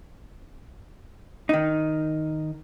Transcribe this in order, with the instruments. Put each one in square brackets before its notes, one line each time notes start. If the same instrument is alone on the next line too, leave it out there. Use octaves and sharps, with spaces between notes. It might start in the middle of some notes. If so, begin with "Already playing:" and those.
[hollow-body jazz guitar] D#3 D#4